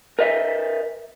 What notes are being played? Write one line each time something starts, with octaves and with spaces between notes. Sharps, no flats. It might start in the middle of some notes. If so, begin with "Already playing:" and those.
A#4 B4 D#5 E5